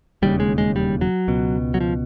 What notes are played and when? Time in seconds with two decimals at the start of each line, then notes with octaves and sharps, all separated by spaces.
0.22 E1 D#2 C#3 G3
0.40 G#3
0.58 G#3
0.76 G3
1.01 F#3
1.28 C#2 B2
1.74 F#3
1.81 F3